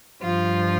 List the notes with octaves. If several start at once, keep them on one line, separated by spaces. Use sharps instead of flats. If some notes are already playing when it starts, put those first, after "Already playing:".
G2 F3 F4